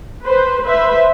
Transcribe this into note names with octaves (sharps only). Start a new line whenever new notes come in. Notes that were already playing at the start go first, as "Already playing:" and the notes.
B4 C5
B4 C5 E5